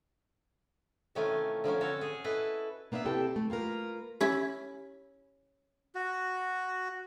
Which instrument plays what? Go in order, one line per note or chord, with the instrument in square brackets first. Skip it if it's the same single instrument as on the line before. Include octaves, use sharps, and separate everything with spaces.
[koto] C3 D#3 E3 A3 C#4 F4
D3 F3 A#3 C#4
C4 C#4 F#4 A4 C#5
G#4
E4 A4 B4 D#5
[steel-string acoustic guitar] A#3 B3 D4 D#5 E5
C3 C4 E4 G4 A4 G5
A3
A#3 F4 F#4 A#4 B4
[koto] C#4 E4 [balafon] G4
[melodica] F#4